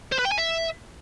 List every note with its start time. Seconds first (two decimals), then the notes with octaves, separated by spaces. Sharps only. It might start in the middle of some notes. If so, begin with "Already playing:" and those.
0.12 C5
0.19 B4
0.25 G5
0.32 G#5
0.38 E5